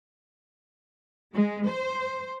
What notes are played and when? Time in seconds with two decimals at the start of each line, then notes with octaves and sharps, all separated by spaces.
1.34 G#3
1.67 C5